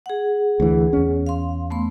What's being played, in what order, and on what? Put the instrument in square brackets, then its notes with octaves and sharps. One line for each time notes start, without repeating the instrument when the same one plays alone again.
[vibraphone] G#4 F#5
[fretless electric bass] D2 E3
E2 C#4
[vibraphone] F5 C6
A3 B3 C6